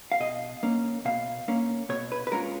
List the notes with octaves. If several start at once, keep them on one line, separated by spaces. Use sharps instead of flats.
F5
B2 D#5
A#3 C#4
B2 F5
A#3 C#4
B2 C#5
B4
B4
G#3 C#4 F4 A#4